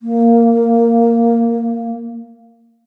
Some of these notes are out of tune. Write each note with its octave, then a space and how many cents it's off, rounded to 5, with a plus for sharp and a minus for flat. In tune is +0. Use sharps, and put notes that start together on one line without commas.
A#3 -10